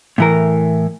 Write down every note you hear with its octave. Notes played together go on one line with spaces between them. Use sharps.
A2 E3 A#4